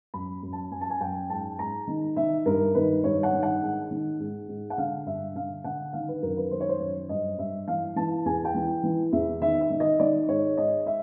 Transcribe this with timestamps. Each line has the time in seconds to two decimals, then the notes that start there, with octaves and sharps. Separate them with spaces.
0.14 F#2 B5
0.43 F#2
0.53 A5
0.72 F#2 G#5
0.81 A5
0.90 G#5
1.01 F#2 G5
1.30 G#2 A5
1.59 G#2 A#5
1.88 D#3
2.16 D#3 E5
2.46 G2 A#4
2.75 D#3 B4
3.04 G2 C#5
3.23 F#5
3.33 D#3
3.43 F#5
3.62 G#2
3.91 D#3
4.20 G#2
4.48 G#2
4.70 F#5
4.78 D3 F5
5.06 G2 E5
5.35 D3 F5
5.64 D3 F#5
5.93 D#3 F5
6.08 B4
6.23 F#2 A#4
6.37 B4
6.51 D#3 C5
6.60 C#5
6.69 C5
6.80 F#2
7.09 G2 D#5
7.38 G2 E5
7.68 E3 F5
7.96 E3 A5
8.26 E2 G#5
8.45 G5
8.55 E3
8.84 E3
9.13 E2 E5
9.42 D#3 E5
9.61 E5
9.70 D#3
9.80 D#5
10.00 D#3 D5
10.28 G#2 C#5
10.57 G#2 D#5
10.86 E5